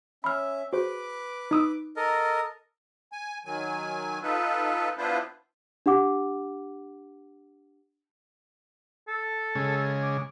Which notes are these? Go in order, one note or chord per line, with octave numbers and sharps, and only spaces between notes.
C#4 E5 B5 F6
F#4 G#4 B4 C5 D6
D#4 D#6 E6
A4 A#4 D#5
G#5
D#3 F#3 G#5
D#4 F4 A4 B4
B3 D4 E4 F4 B4 C5
D4 G4 F#5 D6
A4
C#3 G#3
D6